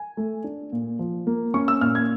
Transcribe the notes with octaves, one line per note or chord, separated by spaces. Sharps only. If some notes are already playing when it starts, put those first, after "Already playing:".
Already playing: G#5
A3
D4
A#2
F3
A#3
C#4 C#6
E6
A#2 F6
G#6